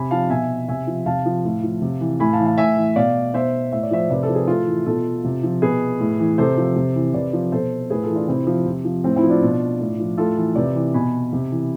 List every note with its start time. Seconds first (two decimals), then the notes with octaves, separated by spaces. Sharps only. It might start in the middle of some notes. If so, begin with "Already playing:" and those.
Already playing: C3 G#5 B5
0.11 F3 F5 A5
0.30 B2 E5 G#5
0.68 C3 E5 G#5
0.87 F3
1.06 C3 F5 A5
1.26 F3
1.44 A2
1.63 F3
1.82 C3
2.01 E3
2.20 A2 G#5 B5
2.33 F5 A5
2.39 E3
2.45 F5 A5
2.58 A2 E5 G#5
2.77 E3
2.96 B2 D5 F5
3.34 B2 C5 E5
3.72 A2 E5
3.83 D5
3.91 F3 C5 E5
4.10 C3 B4 D5
4.23 A4 C5
4.29 F3
4.35 G#4 B4
4.48 A2 F4 A4
4.67 E3
4.86 B2 F4 A4
5.24 C3
5.43 F3
5.62 B2 G#4 B4
6.00 A2
6.19 E3
6.38 C3 A4 C5
6.57 F3
6.76 C3
6.95 E3
7.14 C3 B4 D5
7.33 F3
7.52 B2 A4 C5
7.90 A2 G#4 B4
8.03 F4 A4
8.09 E3
8.15 D4 F4
8.28 C3 C4 E4
8.47 F3
8.66 C3
8.85 F3
9.04 A2 C4
9.16 C4 E4
9.23 F3
9.30 D4 F4
9.43 B2
9.80 A2
10.00 F3
10.18 A2 F4 A4
10.37 E3
10.55 C3 B4 D5
10.75 E3
10.94 B2 G#5 B5
11.33 C3
11.51 E3